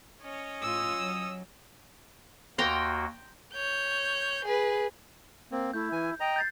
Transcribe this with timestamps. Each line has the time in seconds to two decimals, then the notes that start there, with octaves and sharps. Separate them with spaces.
0.21 C#4 C#5 D#5
0.62 A2 F4 D#6 E6
0.96 F#3
2.58 D#2 A#3 F#4 G5 A#5 C6
3.53 C#5 G6
4.45 G#4 B4
5.52 A#3 C4
5.73 A3 E4 G6
5.92 E3 G#5
6.20 D#5 G5 A#5
6.36 G6 A6 C7